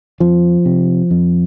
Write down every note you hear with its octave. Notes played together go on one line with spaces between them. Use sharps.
F2 F3
C3
F2